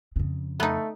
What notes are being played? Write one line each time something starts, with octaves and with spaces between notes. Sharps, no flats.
F2 C#3
A3 B3 D#4